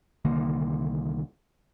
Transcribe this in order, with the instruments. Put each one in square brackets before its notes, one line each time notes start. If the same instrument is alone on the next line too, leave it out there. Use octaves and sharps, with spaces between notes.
[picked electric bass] C2 D3 D#3 A#3